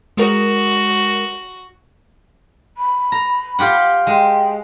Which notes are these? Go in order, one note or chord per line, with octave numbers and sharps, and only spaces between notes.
G#3 F#4 A#4
B5
A#5
F4 G4 F#5
G#3 G5